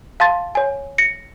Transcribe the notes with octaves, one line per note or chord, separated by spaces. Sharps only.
F5 A5 C6 A6
C#5 G#5
A#6 C#7